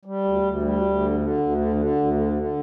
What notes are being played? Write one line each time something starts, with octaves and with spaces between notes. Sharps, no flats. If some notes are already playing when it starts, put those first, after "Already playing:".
G3
D2
D2
G3
D2
D3
D3
D2
D3
D3
D2
D3
D3